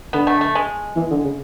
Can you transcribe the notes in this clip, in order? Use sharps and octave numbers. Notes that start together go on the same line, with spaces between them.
D3 B3
A3
A3
G#3
E3
D3
C#3